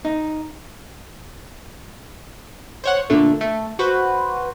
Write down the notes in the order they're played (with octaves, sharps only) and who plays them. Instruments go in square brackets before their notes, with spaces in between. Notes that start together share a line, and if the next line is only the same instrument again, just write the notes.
[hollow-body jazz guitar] D#4
[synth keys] C5 C#5 F#5
A#2 D3 A3
A3
F#4 B4 C5